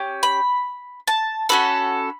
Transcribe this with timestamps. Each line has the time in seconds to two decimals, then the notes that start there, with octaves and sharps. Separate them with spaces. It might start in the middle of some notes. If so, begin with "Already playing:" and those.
Already playing: C#4 G4
0.23 B5
1.07 A5
1.49 C#4 F#4 A4 B5